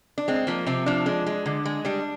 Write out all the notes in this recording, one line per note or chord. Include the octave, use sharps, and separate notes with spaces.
D4
G#3 C4
F3 A#3
C3 C4
F3 D4
G#3 D4
G#3
D3
G#3
G3 D4